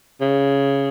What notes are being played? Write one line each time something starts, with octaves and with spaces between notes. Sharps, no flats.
C#3